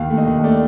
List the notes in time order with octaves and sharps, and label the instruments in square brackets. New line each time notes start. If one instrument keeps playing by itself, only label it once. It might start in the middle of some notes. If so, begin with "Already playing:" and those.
Already playing: [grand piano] D#2 F5
A3
D#5
D#2
A3 D5